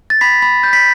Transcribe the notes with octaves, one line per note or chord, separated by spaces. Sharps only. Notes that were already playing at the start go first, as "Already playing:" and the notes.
A6
B5 B6
B5
G6
B6